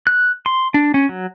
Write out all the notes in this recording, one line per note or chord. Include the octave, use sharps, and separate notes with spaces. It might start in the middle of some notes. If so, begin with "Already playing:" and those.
F#6
C6
D4
C#4
F#3